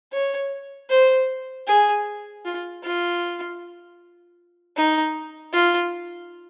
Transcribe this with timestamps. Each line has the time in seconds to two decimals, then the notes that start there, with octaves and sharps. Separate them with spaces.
0.13 C#5
0.90 C5
1.68 G#4
2.45 F4
2.84 F4
4.77 D#4
5.53 F4